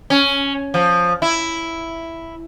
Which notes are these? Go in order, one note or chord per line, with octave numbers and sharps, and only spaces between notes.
C#4
F3
E4